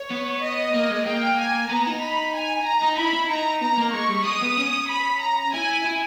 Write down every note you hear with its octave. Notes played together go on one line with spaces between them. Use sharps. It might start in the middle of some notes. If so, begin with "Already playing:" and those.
Already playing: C#5
B3
D#5
A#3
G#3
A#3 G5
G#5
B3 A#5
D#4
B5
G#5
A#5
D#4
E4 B5
E4
D#4 A#5
B3 A#5
A#3
G#3 C#6
G3
G#3 D#6
B3
C#4
B5
A#5
E4 G#5
E4